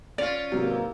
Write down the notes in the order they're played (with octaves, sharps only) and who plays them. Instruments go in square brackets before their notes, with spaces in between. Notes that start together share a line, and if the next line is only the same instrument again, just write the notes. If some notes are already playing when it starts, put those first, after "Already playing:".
[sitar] C#4 F4 [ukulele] D5 [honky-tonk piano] F7
[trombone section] G#2 E3 A#3 [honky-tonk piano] C3 F#3